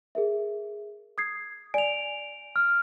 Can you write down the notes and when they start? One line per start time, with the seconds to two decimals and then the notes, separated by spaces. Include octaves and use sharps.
0.15 G#4 A#4 E5
1.18 D#6 G#6 C7
1.74 D5 G#5 D7 F7
2.56 F6